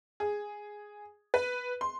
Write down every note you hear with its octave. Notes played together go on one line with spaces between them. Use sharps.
G#4
B4
C6